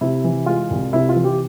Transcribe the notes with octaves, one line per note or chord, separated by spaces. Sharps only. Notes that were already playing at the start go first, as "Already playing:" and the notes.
C3 E4
E3
G#3 F4
C2
C3 E4
F4
E3
G4